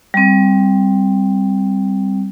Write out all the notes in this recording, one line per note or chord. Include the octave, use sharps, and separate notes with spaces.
G3 C4